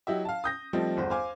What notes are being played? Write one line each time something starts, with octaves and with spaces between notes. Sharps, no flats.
F#3 E4 G4 D#5 E5
F5 A5
D#6 G6 A#6
F3 G3 A3 C4 D#4
G1 E2 C5
C5 F5 G#5 D6